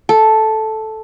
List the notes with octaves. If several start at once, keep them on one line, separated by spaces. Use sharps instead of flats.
A4